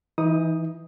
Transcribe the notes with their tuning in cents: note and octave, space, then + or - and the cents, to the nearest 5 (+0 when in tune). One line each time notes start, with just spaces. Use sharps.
E3 +0 D#4 +30 D#6 +0